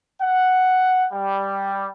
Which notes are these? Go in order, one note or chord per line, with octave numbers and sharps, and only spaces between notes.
F#5
G3